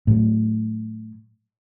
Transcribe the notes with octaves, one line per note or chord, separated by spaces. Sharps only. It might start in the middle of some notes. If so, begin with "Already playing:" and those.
A2 F#3